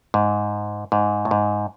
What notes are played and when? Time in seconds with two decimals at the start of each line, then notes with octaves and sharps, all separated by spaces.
0.14 G#2
0.92 G#2
1.25 A2
1.31 G#2